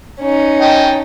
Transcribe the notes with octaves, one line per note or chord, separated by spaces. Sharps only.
C#4 D#4
D#5 G5 A5